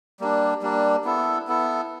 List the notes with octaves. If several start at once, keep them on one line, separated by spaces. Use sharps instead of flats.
G3 A#3 D4
G3 A#3 D4
B3 E4 A4
B3 E4 A4